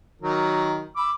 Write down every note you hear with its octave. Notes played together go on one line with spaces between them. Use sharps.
D#3 F#3 A#4
B5 D6 E6